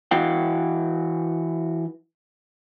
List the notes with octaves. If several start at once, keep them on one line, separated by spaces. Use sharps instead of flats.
E3 E4 F#4 F5 G5